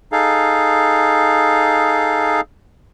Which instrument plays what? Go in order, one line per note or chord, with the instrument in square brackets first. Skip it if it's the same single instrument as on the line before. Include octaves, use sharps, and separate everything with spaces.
[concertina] D#4 G#4 A4 F5